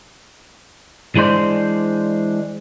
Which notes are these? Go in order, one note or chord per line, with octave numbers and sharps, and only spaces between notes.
E3 G#3 D4 C5